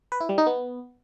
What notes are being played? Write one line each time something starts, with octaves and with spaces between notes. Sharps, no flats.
B4
E4
G3
D#4
B3